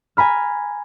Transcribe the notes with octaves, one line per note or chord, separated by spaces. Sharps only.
G#5 A#5 B5 F6